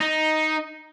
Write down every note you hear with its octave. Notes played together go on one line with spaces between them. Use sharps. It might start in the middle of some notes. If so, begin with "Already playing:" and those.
D#4